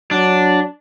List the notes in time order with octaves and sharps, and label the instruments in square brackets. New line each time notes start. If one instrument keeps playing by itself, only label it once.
[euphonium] F#3 [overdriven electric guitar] D4